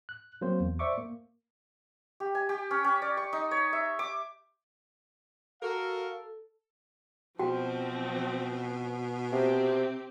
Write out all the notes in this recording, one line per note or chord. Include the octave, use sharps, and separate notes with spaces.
F#6
F#3 A#3 C4 C5
E2
C5 D5 E5 C#6 D6
A#3
G4
G#5
G4
C#4
C#4
D5
C#6
D#4
C#5
E5
D6
F#4 A4 A#4 F5
B2 F3 C4 F#4 G5
C3 C4 G4